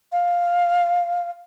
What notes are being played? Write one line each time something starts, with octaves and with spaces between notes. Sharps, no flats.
F5